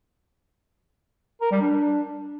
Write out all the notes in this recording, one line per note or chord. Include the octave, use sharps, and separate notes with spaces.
A#4
G3
D4